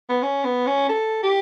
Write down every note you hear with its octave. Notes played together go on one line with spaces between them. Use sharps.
B3
C#4
B3
C#4
A4
G4